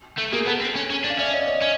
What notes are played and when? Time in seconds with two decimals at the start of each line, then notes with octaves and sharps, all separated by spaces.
0.18 A3
0.32 A#3 G#4 A#4
0.46 B3 A4 B4
0.61 C4
0.75 C#4
0.90 C#4
1.04 D4
1.10 F5
1.18 C#4 D5 E5
1.33 C#5 D#5
1.41 D5
1.47 C#5 D#5
1.62 C#4